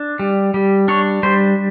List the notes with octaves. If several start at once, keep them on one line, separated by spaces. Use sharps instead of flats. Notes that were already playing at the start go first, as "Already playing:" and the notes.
Already playing: D4
G3
G3
D4 C#5
G3 C5